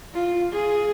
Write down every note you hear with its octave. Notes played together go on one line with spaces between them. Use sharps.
F4
G#4